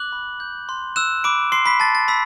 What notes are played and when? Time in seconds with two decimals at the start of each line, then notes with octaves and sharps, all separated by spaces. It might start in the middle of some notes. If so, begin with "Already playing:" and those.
Already playing: D6 F#6 F#7
0.12 B5
0.40 G6
0.69 C6
0.96 E6 F#6 E7
1.24 B5 D6 D7
1.52 C6 D6 C7
1.66 B5 B6
1.80 A5 A6
1.95 A6
2.08 B5 E6 B6